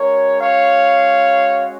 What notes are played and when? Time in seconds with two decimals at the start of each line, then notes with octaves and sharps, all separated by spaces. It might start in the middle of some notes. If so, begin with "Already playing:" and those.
Already playing: G#3 C#4 F#4 A#4 C#5
0.40 C#5 F5